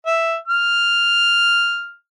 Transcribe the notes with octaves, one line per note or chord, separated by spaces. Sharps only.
E5
F6